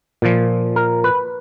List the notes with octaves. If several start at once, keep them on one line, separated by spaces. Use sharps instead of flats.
A#2 F3
A#4
B4